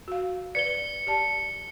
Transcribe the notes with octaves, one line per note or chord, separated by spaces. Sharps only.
F#4 F5
B4 D5 C#7 G7
G4 D5 A5